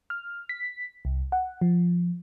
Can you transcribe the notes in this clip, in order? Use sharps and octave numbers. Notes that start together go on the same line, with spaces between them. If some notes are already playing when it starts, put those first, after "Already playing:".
F6
B6
C2
F#5
F3